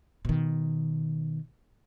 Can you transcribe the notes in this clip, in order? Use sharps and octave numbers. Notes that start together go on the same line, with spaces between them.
B2 D#3